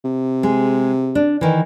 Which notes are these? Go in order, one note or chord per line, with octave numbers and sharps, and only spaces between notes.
C3
G#3
D4
D#3 E3